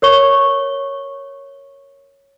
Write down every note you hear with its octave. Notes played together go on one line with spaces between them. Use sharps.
A#4 C#5 C#6 G7